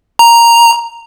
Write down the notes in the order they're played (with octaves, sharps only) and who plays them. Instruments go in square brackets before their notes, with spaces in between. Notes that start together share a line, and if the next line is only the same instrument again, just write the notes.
[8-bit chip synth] A#5